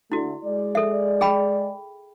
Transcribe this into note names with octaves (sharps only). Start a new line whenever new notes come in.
D3 A3 E4 F#4
G#3 D5
A4 E5
G#4 G5 B5